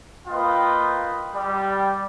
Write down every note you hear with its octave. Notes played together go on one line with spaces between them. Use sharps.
A#3 F4 B4 D#5 G5
G3